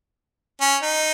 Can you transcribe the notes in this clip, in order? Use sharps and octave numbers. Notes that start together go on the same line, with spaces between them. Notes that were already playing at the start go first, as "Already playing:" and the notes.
C#4
D#4